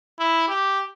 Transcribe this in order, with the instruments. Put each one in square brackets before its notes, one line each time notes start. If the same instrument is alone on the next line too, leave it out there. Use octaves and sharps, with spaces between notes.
[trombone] E4
G4